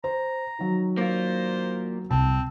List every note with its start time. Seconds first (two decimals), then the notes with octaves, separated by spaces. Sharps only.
0.04 C5 A#5
0.59 D#3 F#3
0.97 A#3 F4 C5
2.11 C2 C3 C4 A5